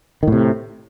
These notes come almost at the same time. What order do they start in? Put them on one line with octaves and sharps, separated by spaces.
D#3 A2 C3